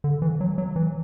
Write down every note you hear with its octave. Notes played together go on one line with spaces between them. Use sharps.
D3
E3
F#3
F#3
E3